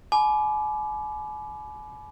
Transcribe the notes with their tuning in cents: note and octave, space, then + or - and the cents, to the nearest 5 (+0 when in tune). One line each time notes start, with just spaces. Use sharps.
G#5 +40 B5 +0 D6 +0